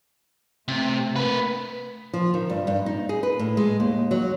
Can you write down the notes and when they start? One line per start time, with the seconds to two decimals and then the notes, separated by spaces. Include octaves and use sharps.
0.68 C3 A3
1.16 A#3 B4
2.13 F3
2.34 D#3
2.50 G2
2.67 G2
2.86 D#4
3.09 G#4
3.23 B4
3.39 A2
3.57 G#3
3.80 D#2
4.11 F#3